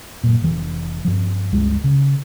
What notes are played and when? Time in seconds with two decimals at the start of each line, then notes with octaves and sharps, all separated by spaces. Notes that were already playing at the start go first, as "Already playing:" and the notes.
0.24 F#2 A#2
0.42 F1 E3
1.05 G2 F3
1.52 G1 C#2 G#3
1.84 C#3